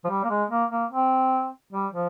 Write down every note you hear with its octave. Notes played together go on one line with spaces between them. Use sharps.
F3
G3
A#3
G#3
A#3
A#3
C4
G3
F3